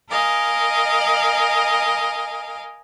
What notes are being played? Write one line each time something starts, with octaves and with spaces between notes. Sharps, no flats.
A#4 D#5 F5 G#5